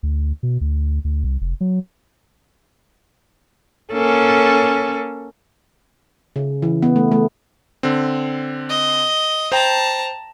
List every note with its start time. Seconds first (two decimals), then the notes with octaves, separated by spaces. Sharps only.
0.03 D2
0.43 B2
0.61 D2
1.04 D2
1.24 C2
1.41 F1
1.61 F#3
3.92 A#3 C#4 A4
6.36 C#3
6.62 E3
6.83 B3
6.96 A3
7.12 A3
7.83 D3 C4
8.69 D#5
9.52 C5 G5 A5 A#5